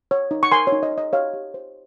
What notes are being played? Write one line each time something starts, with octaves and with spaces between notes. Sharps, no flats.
C#5
D#4
C#6
A#4 G#5 C6
C#5
D#4
D#5
C#5
D#5
G4 C#5 F5
G4
C5